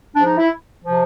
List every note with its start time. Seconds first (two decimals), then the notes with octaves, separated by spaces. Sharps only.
0.14 G#2 F3 D4
0.26 D#4
0.37 E4
0.83 C3 F3